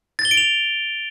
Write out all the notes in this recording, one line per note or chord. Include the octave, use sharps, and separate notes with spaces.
A6
G7
D7
F7